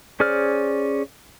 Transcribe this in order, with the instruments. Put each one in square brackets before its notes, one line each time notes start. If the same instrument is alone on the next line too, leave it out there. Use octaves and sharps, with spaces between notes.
[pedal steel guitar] C#4 G#4 C5 D5 F6